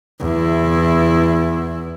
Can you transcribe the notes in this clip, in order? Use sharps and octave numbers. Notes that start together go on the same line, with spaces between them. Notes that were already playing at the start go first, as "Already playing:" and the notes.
E2 E4